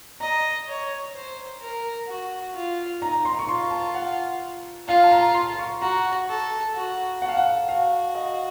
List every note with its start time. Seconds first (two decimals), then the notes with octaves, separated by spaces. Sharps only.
0.20 D#5 A#5
0.68 C#5
1.14 C5
1.61 A#4
2.08 F#4
2.55 F4
3.01 D#4 A#5
3.25 C6
3.39 C#6
3.48 F4 C6
3.71 A5
3.95 F#5
4.88 F4 F5
5.04 A5
5.11 A#5
5.34 C6
5.59 C#6
5.81 F#4 A#5
6.29 A4
6.75 F#4
7.22 A4 F#5
7.29 F5
7.37 F#5
7.69 F#4 F5
8.15 D#5